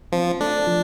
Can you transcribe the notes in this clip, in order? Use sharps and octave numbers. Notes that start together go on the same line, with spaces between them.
F3 C4
A3 D4
F3